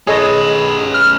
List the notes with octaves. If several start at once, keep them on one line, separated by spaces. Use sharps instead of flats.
C#4 G#4 A4 B4 C#5 D#5
F6